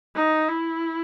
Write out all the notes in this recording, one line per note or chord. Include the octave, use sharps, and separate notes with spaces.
D#4
E4